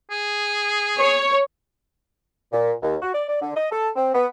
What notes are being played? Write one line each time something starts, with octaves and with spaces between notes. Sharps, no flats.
G#4
C#5
A#2
D#2
F#4
D5
D5
D3
D#5
A4
C4
B3